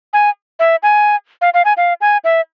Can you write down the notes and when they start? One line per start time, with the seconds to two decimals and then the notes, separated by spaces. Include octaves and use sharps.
0.13 G#5
0.59 E5
0.83 G#5
1.42 F5
1.54 F5
1.65 G#5
1.77 F5
2.01 G#5
2.24 E5